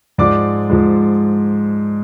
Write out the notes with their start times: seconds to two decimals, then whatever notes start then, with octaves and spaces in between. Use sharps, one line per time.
0.18 G#2 F3 G#3 D5 D6
0.70 G#2 F3 G#3